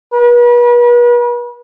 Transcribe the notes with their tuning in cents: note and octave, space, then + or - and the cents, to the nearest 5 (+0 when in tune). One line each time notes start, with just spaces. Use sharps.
B4 -40